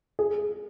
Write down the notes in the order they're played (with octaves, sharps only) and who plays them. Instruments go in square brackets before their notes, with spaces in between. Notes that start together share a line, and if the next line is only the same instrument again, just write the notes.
[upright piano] G#4